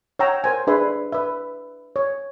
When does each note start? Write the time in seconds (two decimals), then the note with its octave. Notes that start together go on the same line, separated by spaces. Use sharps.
0.19 C#5 F#5 G5 A#5 E6
0.44 A#4 C5 G#5
0.67 D4 G#4 B4 E5 G#5 C6
1.12 B4 E5
1.96 C#5